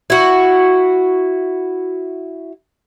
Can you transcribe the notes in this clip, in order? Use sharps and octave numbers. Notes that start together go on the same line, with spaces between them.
E4 F#4